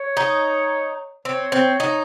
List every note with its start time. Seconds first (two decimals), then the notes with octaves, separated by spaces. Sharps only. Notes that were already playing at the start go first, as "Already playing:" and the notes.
Already playing: C#5
0.17 D#4
1.25 C4 C#5
1.52 C4
1.80 D#4